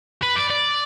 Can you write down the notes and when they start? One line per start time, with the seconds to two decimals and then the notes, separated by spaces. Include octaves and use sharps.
0.23 B4
0.36 D5
0.50 D5